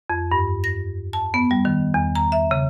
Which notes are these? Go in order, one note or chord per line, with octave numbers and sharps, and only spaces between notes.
F2
G2
A#6
A5
B3
G3
D#3
E2
A#5
E5
C#3